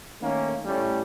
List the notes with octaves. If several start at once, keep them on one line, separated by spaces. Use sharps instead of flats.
D#3 A3 A#3 C#4
A2 G3 A3 C#4